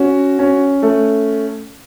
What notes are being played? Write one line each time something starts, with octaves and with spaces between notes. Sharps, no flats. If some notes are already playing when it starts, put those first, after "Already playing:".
Already playing: C#4 F#4
C#4
A3